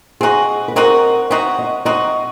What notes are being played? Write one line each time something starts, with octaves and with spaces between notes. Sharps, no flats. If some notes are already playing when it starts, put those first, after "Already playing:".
C4 D#4 F#4 G#4
B4
C4 D#4 F#4 A#4
C4 D#4 F#4 E5
D#5
C4 D#4 F#4 D#5